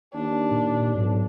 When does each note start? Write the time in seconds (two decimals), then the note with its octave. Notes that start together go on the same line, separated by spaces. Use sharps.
0.15 D#2 D4
0.51 A#2
0.95 B1 G#2